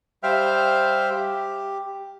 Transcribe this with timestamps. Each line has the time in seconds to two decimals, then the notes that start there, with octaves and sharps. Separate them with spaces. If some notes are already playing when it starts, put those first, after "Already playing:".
0.23 G3 C5 E5 F5 G5 F6
1.10 G4